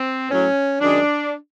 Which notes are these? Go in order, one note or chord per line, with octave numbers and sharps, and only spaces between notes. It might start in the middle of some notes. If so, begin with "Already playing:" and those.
Already playing: C4
A2 F#3 C#4
F#2 D#3 G#3 D4